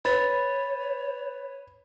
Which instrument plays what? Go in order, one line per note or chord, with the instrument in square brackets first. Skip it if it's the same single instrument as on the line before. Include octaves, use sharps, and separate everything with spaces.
[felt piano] B4 [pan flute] C#5 [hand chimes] B5 A6